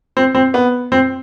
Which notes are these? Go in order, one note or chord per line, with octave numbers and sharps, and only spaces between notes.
C4
C4
B3
C4